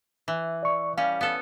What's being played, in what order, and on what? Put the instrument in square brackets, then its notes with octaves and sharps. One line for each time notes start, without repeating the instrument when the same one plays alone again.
[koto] E3
[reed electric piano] D5 C#6
[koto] G3 C#4 [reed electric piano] F5
[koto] B3 A4